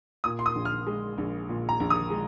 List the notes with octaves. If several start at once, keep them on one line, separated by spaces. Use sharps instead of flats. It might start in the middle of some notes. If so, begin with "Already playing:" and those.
A#2 D#6
C6
D#6
A#1
F6
G#3
A#1
A#2
A#5
A#1
D#6
G#3